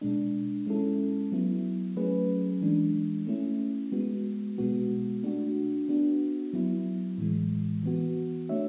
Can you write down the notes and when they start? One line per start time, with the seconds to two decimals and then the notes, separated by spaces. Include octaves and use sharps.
0.01 B2 G#3 D4
0.66 G#3 C#4 E4 A4
1.32 F#3 B3 E4
1.97 F#3 A3 C#4 G#4 B4
2.61 E3 G#3 D4
3.27 A3 C#4 E4
3.92 G#3 B3 F#4
4.58 B2 G#3 B3 F#4
5.23 A3 D4 F#4
5.89 B3 D4 F#4
6.53 F#3 B3 E4
7.18 A2 E3 G#3
7.83 E3 B3 F#4
8.49 A3 D4 F#4 C#5 E5